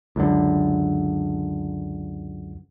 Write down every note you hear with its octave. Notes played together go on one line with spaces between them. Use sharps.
C#2 F#2 D3